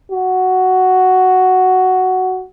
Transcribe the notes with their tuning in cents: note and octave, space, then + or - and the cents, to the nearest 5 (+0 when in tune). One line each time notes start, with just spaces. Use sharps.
F#4 +5